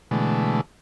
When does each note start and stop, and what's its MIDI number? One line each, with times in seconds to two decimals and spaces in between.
0.11 0.61 47
0.11 0.61 50
0.11 0.61 52
0.11 0.61 56
0.11 0.61 57